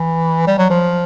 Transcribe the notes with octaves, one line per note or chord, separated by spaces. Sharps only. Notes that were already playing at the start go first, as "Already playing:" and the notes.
Already playing: E3
G3
F#3
F3